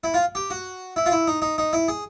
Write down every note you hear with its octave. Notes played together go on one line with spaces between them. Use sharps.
E4
F4
G4
F#4
E4
F4
E4
D#4
D#4
D#4
E4
G#4